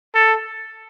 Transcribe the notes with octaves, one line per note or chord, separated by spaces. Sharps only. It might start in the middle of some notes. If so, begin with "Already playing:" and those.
A4